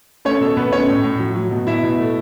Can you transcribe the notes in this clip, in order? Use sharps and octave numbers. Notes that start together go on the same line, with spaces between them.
A3 C#4 C#5
B2 A4
B2 B3 B4
A3 C#4 C#5
A2
A2
F#3
F#3
B2
B2 E4 E5
B2
A3